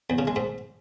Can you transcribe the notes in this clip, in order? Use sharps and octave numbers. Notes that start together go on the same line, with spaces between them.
E2
C#3
G#3
G#2